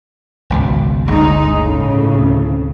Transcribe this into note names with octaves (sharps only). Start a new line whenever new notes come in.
G#1 C#2 B2
G1 D2 G#3 D#4
A2 C#3
D2 C3